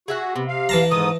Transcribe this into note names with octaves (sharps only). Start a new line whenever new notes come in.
F#4 G#4 E5 F#5
C3 B3
F5
E3 A5 A#5
G#2 D#3 A4 D#6